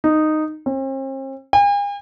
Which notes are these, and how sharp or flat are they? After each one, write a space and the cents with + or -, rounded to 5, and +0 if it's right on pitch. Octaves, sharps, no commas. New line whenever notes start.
D#4 -10
C4 +45
G#5 -45